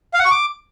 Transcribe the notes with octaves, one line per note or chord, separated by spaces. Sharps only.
F5
F#5
C#6
D6